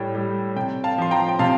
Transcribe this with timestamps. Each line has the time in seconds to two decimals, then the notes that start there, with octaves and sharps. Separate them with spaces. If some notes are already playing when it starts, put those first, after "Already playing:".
Already playing: A2 G3 G5
0.15 G3
0.56 C3 G5
0.84 F5 A5
0.98 F3 C6
1.11 G5 A#5
1.28 G5
1.39 C3 F5 A5